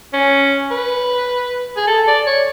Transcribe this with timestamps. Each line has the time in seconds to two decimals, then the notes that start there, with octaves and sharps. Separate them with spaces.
0.13 C#4
0.71 B4
1.77 G#4
1.87 A4
2.07 D5
2.26 C#5